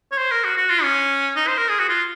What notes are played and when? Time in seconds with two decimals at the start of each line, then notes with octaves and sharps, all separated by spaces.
0.12 C#5
0.18 C5
0.31 A#4
0.44 F#4
0.57 F#4
0.70 F4
0.83 C#4
1.36 D#4
1.47 C5
1.57 A#4
1.69 G#4
1.79 F#4
1.89 F4